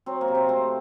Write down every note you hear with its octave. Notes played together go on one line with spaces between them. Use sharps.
F#3 C4
A#3
C3
C4
A3 C4